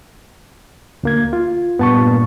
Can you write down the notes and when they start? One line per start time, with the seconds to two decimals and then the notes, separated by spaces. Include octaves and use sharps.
1.03 D2 A#3 G#6
1.33 F4
1.79 G2 A#2 B3 A5 C#6